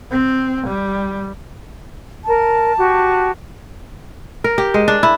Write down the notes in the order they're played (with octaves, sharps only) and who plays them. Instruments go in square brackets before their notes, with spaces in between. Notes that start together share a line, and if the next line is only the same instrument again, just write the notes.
[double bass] C4
G3
[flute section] A#4 [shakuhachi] A5
[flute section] F#4 G4
[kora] A#4
G4
G#3
D4
E4